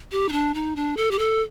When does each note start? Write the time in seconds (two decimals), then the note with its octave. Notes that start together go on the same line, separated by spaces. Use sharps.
0.12 G4
0.29 D#4
0.32 D4
0.54 D#4
0.76 D4
0.97 A4
1.11 G4
1.19 A4